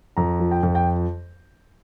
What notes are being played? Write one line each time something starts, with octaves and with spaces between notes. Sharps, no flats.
F2 A#5
F3
G5
F2
G5